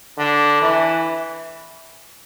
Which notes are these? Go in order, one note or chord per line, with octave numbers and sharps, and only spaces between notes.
D3
E3